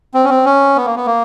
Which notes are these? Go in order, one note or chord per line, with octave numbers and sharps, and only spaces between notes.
C4
C#4
C4
C#4
B3
A#3
B3
A#3